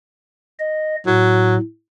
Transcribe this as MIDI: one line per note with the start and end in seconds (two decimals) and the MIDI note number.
0.59 0.96 75
1.07 1.58 45
1.07 1.56 54